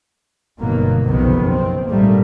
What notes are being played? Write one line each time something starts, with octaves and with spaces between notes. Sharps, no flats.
G1 G2 B2 D#3 F#3 A#3
F#1 B1 F2 C3 D#3 B3
C4
A#1 G#2 D#3 G3 A3 A#3